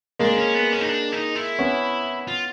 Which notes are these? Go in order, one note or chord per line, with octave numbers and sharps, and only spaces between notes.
G#3 A#3 D4
C#4
B3
C#4
D#4
D4
D#4
E4
B3 C#4
F4